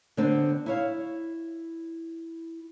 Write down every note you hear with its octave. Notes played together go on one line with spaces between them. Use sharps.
D3 B3 C4 D4
E4 C#5 F5